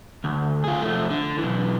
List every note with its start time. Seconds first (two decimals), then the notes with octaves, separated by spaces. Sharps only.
0.24 D2
0.64 F4 G#4
0.82 F3 A3
1.10 D3
1.39 B1 E3